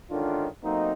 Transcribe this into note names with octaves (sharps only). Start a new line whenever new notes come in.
G#2 D3 D#3 C#4 D4 F4
F#3 A3 A#3 C4 D#4